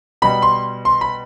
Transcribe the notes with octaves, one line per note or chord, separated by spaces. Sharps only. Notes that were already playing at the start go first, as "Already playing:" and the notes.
B2 G3 B5
C6
C6
B5